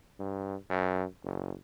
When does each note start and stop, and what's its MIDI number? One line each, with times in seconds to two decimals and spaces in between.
0.19 0.55 43
0.70 1.04 42
1.24 1.53 30